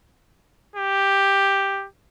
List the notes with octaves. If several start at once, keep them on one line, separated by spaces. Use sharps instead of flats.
G4